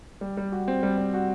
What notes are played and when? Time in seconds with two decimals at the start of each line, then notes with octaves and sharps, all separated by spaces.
0.21 G3
0.37 G3
0.52 F#4
0.68 C4
0.83 G3
0.98 G3
1.14 F#4